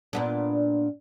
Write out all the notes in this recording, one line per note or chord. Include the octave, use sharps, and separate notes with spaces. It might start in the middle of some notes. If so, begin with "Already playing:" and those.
A#2 B3 D4